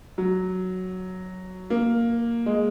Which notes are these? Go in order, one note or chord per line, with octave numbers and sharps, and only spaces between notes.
F#3
A#3
G#3